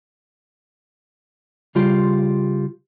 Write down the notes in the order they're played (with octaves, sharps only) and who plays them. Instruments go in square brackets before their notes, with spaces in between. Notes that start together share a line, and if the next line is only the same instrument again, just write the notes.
[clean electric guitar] C#3 G3 F4 G4 C6